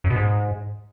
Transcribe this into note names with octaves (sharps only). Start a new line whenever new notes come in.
F#2
B2
G#2